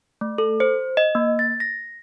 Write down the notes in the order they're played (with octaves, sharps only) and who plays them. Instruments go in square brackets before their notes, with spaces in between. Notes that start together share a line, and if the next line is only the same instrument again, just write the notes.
[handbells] A3
A4
C5
D#5
A#3
A6
A#6